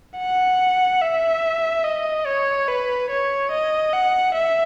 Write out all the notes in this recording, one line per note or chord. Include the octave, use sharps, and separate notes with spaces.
F#5
E5
D#5
C#5
B4
C#5
D#5
F#5
E5